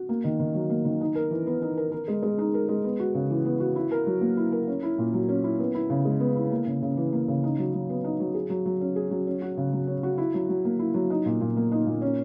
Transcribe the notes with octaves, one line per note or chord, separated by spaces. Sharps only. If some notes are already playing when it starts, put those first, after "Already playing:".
Already playing: F#4
A#3
D#3
D#3
F#3
A#3
D#3
D#4
A#4
E3
B3
D#4
A#4
A#4
G#3
G#3
D#4
A#4
G#3
B3
F#4
C#3
E3
B3
F#4
E4
A#4
F#3
A#3
E4
A#4
C#4
E4
A#2
F#3
C#4
E4
B3
E4
C#3
G#3
B3
E4
A#3
C#3
C#3
E3
A#3
C#3
D#4
F#3
F#3
B3
D#4
F#3
G#4
F#3
F#3
C#4
G#4
F#3
C#4
F#4
C#3
F#3
C#4
F#4
E4
F#3
F#3
A#3
E4
F#3
D#4
A#2
A#2
A#3
D#4
A#2
C#4